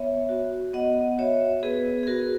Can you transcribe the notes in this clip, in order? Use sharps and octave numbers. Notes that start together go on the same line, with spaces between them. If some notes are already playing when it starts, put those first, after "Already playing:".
Already playing: B3 C#5 E5
F#4
B3 D#5 F#5
F#4 C#5 E5
B3 G#4 B4
G#4
F#4 A#4